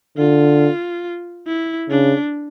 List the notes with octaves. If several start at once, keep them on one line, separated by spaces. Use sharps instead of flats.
D3 F4
E4
C#3 D4